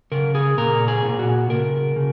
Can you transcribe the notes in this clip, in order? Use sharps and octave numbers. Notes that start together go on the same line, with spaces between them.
C#3 A#4
G#4
A#2 A#4
G#4
A#2
F#4
C#3 A#4
C#3